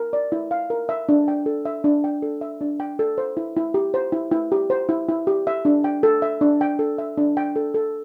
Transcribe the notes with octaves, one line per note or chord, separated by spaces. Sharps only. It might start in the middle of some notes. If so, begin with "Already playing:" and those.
Already playing: A#4
D5
E4
F5
A#4
E5
D4
G5
A4
E5
D4
G5
A4
E5
D4
G5
A4
C5
E4
E4
G4
C5
E4
E4
G4
C5
E4
E4
G4
E5
D4
G5
A4
E5
D4
G5
A4
E5
D4
G5
A4
A4